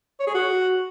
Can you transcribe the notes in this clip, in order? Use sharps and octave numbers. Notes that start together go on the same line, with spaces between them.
C#5
G#4
F#4